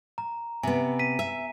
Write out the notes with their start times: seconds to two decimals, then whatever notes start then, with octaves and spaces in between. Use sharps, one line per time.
0.18 A#5
0.63 C3 B3 G#5
0.99 B6 D#7
1.19 E5